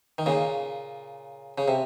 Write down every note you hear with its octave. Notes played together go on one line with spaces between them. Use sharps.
D#3
A#2 C#3
C#3
C3